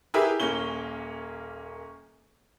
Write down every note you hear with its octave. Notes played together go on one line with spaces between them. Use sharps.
E4 G4 G#4 A#4 B4 E5
D#1 A#3 C#4 G7